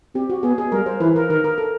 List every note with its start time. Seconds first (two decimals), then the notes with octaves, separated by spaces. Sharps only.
0.15 C4 G4
0.30 F#4
0.43 B3 G#4
0.58 G#4
0.72 G3 A#4
0.86 C5
1.01 E3 B4
1.16 A#4
1.30 D#3 A#4
1.44 A#4
1.58 A4